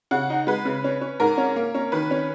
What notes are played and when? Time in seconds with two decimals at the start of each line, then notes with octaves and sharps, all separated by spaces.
0.11 C#3 F#5
0.30 D#4
0.47 G#3 B4
0.65 C#3
0.84 C#4
1.01 C#4
1.20 G#2 A#4
1.37 C#4
1.56 A#3
1.75 C#4
1.92 D#3 B4
2.11 C#4